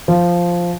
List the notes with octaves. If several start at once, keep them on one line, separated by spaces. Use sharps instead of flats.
F3